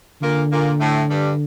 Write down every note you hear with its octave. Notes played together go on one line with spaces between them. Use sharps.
A#2 D3 A#3
A#2 A#3
A2 A3
G2 G3